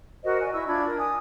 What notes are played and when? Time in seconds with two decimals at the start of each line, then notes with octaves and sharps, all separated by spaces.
0.24 F#4 A#4 C5 D#5
0.41 D5 G#5
0.54 E4 C#6 E6
0.67 D4 F4 B5 G#6
0.84 A#4
0.99 G#5 D#6